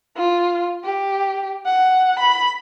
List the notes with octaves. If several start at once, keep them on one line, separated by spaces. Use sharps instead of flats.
F4
G4
F#5
B5